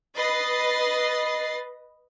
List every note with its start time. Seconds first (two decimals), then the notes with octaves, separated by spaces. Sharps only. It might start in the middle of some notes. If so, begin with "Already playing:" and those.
0.15 B4 D#5 A6 C7